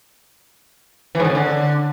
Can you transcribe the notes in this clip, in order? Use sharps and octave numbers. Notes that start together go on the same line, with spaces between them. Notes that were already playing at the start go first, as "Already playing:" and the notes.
E3
G#2
D3
C#3
D3